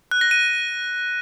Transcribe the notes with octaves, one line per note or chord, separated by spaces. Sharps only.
F#6
A#6
D#7